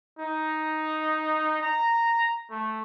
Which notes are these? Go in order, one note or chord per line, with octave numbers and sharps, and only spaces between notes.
D#4
A#5
A3